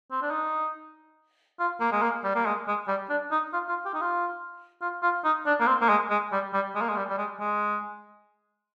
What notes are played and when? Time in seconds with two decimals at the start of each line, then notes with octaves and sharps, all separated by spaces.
0.12 C4
0.22 D4
0.31 D#4
1.60 F4
1.81 A#3
1.92 G#3
2.02 A#3
2.25 G3
2.36 A#3
2.46 G#3
2.68 G#3
2.88 G3
3.10 D4
3.32 D#4
3.53 F4
3.69 F4
3.86 G4
3.94 D#4
4.02 F4
4.82 F4
5.03 F4
5.25 D#4
5.47 D4
5.61 A#3
5.67 C4
5.82 A#3
5.89 G#3
6.10 G#3
6.32 G3
6.54 G3
6.76 G#3
6.82 A#3
6.90 G#3
6.97 G3
7.10 G3
7.18 G#3
7.40 G#3